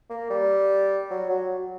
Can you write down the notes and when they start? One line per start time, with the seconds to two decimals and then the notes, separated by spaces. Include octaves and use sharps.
0.10 A#3
0.30 G3
1.11 F#3
1.30 F#3